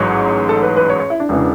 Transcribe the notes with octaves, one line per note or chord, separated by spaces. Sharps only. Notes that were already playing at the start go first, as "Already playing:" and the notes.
Already playing: A1 G#2 F#3 C#5
A4
B4
B4
C#5
C#5
E4
D4
E1 C#3 E3